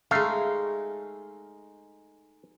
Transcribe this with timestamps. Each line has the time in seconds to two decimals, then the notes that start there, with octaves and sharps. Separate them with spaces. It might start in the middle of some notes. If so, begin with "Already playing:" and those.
0.11 G#3 A3 D#4 F5